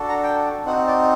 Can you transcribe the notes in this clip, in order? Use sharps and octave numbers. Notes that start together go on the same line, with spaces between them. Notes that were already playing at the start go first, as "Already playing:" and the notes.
Already playing: D4 F#4 A4
A#5
G5
C4 D#4 F#4 F#5
D5